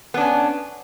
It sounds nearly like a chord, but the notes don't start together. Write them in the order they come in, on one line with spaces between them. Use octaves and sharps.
B3 D4 C#4